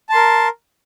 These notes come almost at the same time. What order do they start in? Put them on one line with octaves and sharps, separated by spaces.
A5 C6 A#4